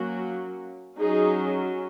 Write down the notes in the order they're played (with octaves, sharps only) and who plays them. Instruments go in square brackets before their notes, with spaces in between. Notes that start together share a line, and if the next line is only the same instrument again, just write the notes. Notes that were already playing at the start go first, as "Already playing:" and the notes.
Already playing: [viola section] F#3 A#3 C#4 F#4
F#3 C#4 D#4 G#4